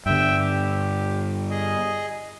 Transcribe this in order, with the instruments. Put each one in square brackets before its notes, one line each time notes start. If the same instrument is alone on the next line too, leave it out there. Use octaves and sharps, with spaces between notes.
[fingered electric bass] G2 D3 [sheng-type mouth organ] E5 G5
[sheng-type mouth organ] G4
G#4 D#5